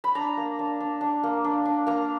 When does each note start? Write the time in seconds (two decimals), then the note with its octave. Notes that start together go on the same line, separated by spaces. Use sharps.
0.04 B5
0.15 D4 A#5
0.37 A#3
0.59 D4
0.80 D4
1.01 D4
1.23 A#3
1.44 D4
1.65 D4
1.87 A#3 A#5